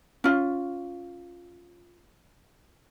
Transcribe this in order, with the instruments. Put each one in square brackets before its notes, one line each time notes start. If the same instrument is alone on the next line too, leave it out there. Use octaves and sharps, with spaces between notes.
[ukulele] C#4 F4